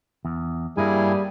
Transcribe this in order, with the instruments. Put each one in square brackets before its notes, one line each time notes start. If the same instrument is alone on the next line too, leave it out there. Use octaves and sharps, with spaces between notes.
[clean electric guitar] E2
[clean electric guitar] G2 A#3 A4 [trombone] G3 [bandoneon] E4 G#4 G#5